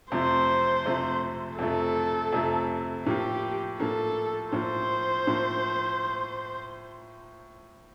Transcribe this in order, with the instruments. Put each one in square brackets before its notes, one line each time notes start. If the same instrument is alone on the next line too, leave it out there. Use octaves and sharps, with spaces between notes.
[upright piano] F2 C3 F3 A3 [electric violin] C5
[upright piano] F2 C3 F3 A3
[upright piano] F2 C3 F3 A3 [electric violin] A4
[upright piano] F2 C3 F3 A3
[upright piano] A2 F3 A#3 [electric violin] G4
[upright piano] A2 F3 A#3 [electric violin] A4
[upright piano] A2 F3 A#3 [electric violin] C5
[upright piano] A2 F3 A#3